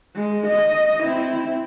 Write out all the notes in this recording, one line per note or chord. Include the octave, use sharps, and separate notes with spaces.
G#3
D#5
C4 E4